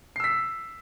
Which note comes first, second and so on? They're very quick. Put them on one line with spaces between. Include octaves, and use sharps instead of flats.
C7 E6 B6